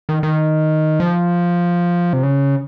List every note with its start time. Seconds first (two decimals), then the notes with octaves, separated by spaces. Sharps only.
0.09 D#3
0.23 D#3
1.00 F3
2.13 C3
2.23 C#3